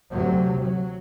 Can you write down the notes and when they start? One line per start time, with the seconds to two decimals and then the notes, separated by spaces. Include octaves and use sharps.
0.12 D2 C3 F#3
0.61 F#3